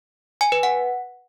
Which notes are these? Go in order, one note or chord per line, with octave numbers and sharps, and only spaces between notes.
G#5
B4
F#5